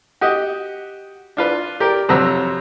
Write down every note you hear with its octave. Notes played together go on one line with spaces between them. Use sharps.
F#4 G4 D#5
D4 F4 B4
G4 A#4 D5
F2 C3 F#3 A#5 E6